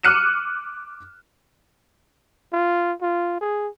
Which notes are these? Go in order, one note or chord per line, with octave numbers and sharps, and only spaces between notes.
D6 F6 F#6 C#7 D#7 E7
F4
F4
G#4